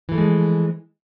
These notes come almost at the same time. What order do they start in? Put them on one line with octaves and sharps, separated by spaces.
E3 A3 F3 G#3